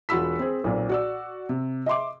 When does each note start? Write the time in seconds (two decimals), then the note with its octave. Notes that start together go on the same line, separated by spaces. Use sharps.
0.09 E1 F4 F#4 B5 E6 B6
0.39 C4 G#4
0.64 B1 A#2 C4
0.89 F#4 D5 E6
1.49 C3
1.86 D#5 E5 C6 D6